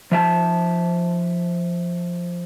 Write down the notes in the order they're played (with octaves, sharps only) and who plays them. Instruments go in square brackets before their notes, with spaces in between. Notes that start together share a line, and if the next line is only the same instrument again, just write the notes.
[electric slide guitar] F3 E5 A5